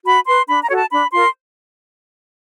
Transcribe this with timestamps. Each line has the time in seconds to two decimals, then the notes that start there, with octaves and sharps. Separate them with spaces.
0.04 F#4 B5
0.27 B4 C6
0.47 D4 B5
0.62 A#5
0.69 F#4 A4 C#5
0.76 A5
0.90 D4 B5
1.12 F4 A#4 C6